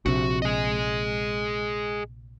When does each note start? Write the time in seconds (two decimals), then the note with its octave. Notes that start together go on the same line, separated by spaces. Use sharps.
0.06 A#1 C3 F#4
0.42 G#4 D#5